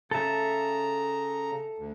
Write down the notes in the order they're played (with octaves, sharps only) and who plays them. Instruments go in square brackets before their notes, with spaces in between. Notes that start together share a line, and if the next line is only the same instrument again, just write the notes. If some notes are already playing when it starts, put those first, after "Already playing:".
[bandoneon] C#3 A#5 [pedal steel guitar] A4 E5
[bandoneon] D2